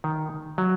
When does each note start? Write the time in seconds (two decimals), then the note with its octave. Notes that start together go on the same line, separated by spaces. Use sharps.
0.04 D#3
0.58 F#3